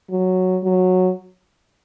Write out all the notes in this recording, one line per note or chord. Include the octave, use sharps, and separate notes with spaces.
F#3
F#3